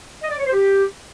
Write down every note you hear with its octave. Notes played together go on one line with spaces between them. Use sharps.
D#5
D5
C#5
C5
G4